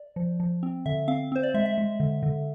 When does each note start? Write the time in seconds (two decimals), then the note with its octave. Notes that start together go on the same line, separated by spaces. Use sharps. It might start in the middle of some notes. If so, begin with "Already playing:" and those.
Already playing: D5
0.16 F3
0.40 F3
0.63 C4
0.86 D3 E5
1.08 C4 F5
1.32 C4 C5
1.43 D5
1.54 G#3 E5
1.66 E5
1.78 G#3
2.00 D3
2.23 D3